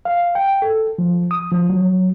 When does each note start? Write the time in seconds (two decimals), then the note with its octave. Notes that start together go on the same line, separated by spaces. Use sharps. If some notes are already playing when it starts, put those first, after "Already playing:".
0.05 F5
0.35 G5
0.62 A4
0.98 F3
1.31 D#6
1.52 F3
1.70 F#3